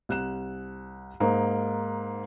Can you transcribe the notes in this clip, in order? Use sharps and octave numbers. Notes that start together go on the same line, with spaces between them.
C2 F#6 E7
G#2 A#3 D#4